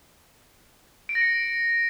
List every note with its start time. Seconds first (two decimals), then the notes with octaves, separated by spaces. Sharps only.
1.09 D7
1.15 A#6
1.21 C#7